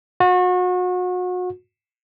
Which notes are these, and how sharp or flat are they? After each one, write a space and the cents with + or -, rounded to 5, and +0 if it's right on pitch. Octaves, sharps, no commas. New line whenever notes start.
F#4 -35